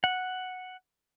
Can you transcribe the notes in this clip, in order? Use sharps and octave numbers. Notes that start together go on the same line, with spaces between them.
F#5